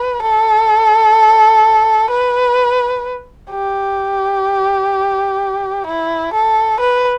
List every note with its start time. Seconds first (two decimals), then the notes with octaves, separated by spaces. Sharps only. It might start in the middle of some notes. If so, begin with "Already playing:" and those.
Already playing: B4
0.22 A4
2.10 B4
3.51 G4
5.86 E4
6.34 A4
6.80 B4